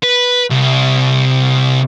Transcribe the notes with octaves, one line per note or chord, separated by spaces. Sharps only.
B4
C2